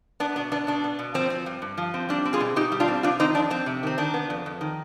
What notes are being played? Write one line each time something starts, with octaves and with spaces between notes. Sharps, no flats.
B3 D4
B2 D4
B3 D4
B2 D4
B3
B2
F3 C4
C4
G2
G2
F3
C4
G3 D4
C4
F4 G#4
B2
B2 D#4 G4
G3
D4 F4
C4
C3 D4 F4
D#3 C4 D#4
F2 D4
F2 C4
C3
D#3 C4
D#3 D4
B3
F2
F2
D#3